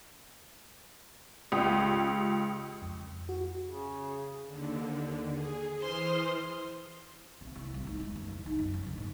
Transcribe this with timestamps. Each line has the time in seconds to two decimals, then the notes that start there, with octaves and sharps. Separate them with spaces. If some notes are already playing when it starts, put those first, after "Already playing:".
1.52 C#2 G4 D#6
2.82 F2
3.29 F#4
3.67 C#3
4.47 D#2 D3
5.34 G#4
5.81 E3 C5 C6 D#6 F6
7.41 C3
7.55 C2
7.74 C3
7.86 G#2
8.00 D#2
8.16 F#1
8.29 D2
8.46 D#4
8.59 F#2
8.74 C#3
8.86 D3
8.98 G#2